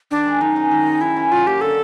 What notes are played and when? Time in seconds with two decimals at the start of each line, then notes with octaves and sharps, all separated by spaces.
0.11 D#3 D4
0.26 G#3
0.41 F#2 D#4
0.56 C#4
0.71 D#3
0.86 G#3
1.01 F#2 E4
1.16 C#4
1.32 F#3 F4
1.47 A#3 G4
1.61 D3 A4